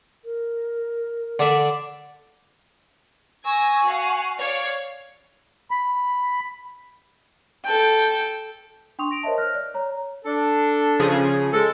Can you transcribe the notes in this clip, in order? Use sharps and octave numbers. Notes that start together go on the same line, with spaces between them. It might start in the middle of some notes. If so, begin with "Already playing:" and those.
A#4
D3 D5 E5
G#5 C#6 E6 G#6 A#6
F#4 F5 F#5
C#5 D5 F5
B5
A4 G5
D4 G5 C6 C#6 D#6 F7
A#6 D7 F7
A#4 C5 C#5 D#5 E5 A5
F6 F#6 A#6
D5
C#5 A#5
D4 A4
C#3 F3 G#4
G#3 A4